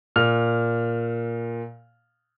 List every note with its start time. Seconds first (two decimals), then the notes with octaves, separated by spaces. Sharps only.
0.16 A#2 F6